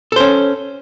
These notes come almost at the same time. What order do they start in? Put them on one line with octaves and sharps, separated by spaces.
A4 C5 C#4